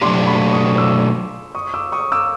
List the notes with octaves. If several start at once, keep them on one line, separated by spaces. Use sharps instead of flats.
B2 F#3 A3 D4 G4 C6 D6
B5 C#6
C#6 D#6
D6 E6
C#6 D#6
D6 E6
C#6 D#6
D6 E6